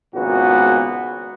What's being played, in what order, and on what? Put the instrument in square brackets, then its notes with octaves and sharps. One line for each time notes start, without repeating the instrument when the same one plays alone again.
[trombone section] G#1 C#2 A#2 B3 F#4